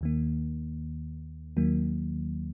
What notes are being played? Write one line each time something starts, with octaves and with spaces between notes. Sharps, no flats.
D#2 D#3 A#3
D#2 D#3 F#3 A#3